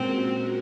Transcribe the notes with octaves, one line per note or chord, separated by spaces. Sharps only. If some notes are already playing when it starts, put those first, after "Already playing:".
Already playing: A#2 G#3 C4 C#4 F#4 A#4